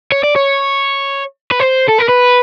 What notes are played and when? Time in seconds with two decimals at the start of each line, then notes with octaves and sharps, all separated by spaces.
0.12 C#5
0.23 D5
0.36 C#5
1.51 B4
1.60 C5
1.88 A4
1.98 A#4
2.08 B4